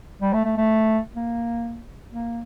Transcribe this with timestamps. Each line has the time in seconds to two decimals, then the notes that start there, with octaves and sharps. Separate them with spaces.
0.22 G3
0.33 A3
0.45 A3
0.57 A3
1.16 A#3
2.11 A#3